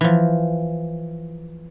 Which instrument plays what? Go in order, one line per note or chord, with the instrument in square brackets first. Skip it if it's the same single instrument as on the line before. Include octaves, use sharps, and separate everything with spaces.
[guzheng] E3 F3